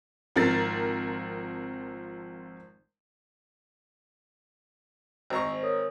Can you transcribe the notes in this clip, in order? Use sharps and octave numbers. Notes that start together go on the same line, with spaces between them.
G#1 F3 C4 A#4 A6
G#1 C5 A#5 C#6 E6
A#4 C#5 D#6